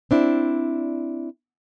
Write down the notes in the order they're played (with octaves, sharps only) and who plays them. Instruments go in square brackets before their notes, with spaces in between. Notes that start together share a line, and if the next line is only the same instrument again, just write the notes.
[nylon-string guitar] C4 D4 E4